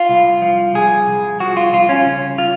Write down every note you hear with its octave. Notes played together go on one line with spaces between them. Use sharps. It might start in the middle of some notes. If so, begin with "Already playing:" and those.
Already playing: F4
C2
F3
C2 G#4
C2
F3 F#4
F4
C2 F4
C#4
C#3
F4